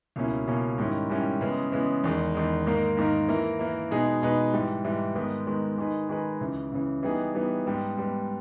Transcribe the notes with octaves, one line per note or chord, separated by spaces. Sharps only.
C#2 B2 A#3 C#4 E4
C#2 B2 A#3 C#4 E4
G#2 D#3 G3 C#4 E4
G#2 D#3 G3 C#4 E4
C#3 E3 G#3 B3
C#3 E3 G#3 B3
E2 D#3 G#3
E2 D#3 G#3
G#2 D#3 A#3 D#4 A#4
G#2 D#3 A#3 D#4 A#4
E3 A#3 E4 A#4
E3 A#3 E4 A#4
B2 G#3 D#4 G#4 B4
B2 G#3 D#4 G#4 B4
G#2 E3 G3
G#2 E3 G3
G#2 D#3 G#3 B3
G#2 D#3 G#3 B3
D#3 G#3 D#4 G#4 B4
D#3 G#3 D#4 G#4 B4
C#2 C#3 E3
C#2 C#3 E3
E3 G3 B3 D#4 G#4
E3 G3 B3 D#4 G#4
G#2 G3 B3
G#2 G3 B3